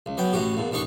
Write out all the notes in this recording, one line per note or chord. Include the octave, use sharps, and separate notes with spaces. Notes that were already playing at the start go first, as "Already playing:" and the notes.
C#2
F#3 B3 G5
A1 A2 F#4 G4
E2 A#2
A1 D#2 D4 D#4 C#6